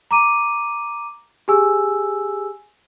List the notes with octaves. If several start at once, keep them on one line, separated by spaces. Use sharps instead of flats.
A#5 D6 D#7
G4 G#4 G#5 E6